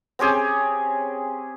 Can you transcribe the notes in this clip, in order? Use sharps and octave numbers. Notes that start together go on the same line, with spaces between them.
C4 C#4 G4 G#4